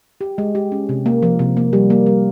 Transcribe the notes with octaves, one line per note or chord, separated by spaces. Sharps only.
G4
G#3
G4
C#4
C3
A#3
F3
C3
A#3
G3
A#3
G3